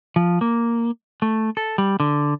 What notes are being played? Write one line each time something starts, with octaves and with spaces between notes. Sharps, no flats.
F3
A#3
A3
A4
G3
D3